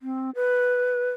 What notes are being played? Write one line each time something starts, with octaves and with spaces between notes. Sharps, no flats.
C4
B4